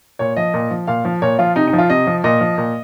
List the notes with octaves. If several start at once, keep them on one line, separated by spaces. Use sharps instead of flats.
A#2 C#5
F3 D#5
A#2
F3
A#2 F5
F3
A#2 C#5
F3 F4
C3 D#4
D#4
F3
F4
C3 D#5
F3
A#2 D#5
F3
A#2